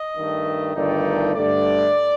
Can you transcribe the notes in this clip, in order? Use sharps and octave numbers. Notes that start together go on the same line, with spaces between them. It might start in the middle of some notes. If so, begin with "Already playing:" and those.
Already playing: D#5
G2 D#3 A3
G1 G2 D#3 A3 D#4 D5
G2 D3 A3 D5